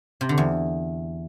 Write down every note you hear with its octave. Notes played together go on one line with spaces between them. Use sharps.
C3
D3
E2